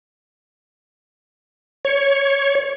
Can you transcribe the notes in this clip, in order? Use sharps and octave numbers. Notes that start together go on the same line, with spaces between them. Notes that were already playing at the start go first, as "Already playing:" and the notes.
C#5